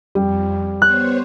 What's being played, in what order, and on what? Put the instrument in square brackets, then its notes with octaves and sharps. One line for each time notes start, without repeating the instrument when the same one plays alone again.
[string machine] F2 [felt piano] G3
[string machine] B3 C5 C#5 [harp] F#6